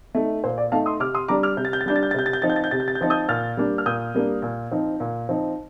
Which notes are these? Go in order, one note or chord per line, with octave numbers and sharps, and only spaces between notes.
A3 D#4
A#2 C5
D5
A3 D#4 F5 A5
C6 D#6
C3 D6 F6
C6 D#6
G3 D4 A#5 D6
D6 F6
C3 G6
A6
G6
A6
G3 D4 G6
A6
G6
A6
C3 G6
A6
G6
F3 C4 D#4 A6
G6
A6
G6
C3 A6
G6
A6
G6
F3 C4 D#4 A6
D#6 G6
A#2 F6 A6
G3 A#3 D4
F6
A#2 D#6 G6
G3 A#3 D4
A#2
F3 C4 D#4
A#2
F3 C4 D#4